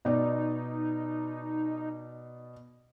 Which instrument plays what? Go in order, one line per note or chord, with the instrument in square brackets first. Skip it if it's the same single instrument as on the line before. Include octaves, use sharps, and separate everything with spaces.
[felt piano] B2 D5 [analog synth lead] D#4